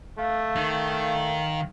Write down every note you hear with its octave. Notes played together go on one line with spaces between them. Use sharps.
A3 F5
D#3